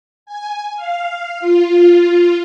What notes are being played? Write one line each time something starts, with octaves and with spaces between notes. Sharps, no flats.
G#5
F5
F4